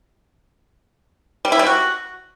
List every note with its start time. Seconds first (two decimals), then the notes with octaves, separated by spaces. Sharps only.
1.45 G3
1.52 E4
1.59 G3
1.67 F#4